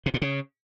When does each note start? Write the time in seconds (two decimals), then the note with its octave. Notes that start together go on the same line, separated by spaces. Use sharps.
0.06 C3
0.14 A#2
0.22 C#3